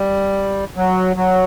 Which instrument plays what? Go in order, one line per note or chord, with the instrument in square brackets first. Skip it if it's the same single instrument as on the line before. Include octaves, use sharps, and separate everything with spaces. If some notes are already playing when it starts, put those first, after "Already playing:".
Already playing: [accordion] G3
F#3
F#3